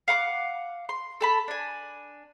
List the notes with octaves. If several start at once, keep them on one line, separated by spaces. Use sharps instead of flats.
F5 F#5 C6 D6
C6
A4 A5 B5
D4 G#5